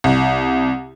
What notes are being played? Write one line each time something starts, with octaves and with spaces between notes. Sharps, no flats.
C2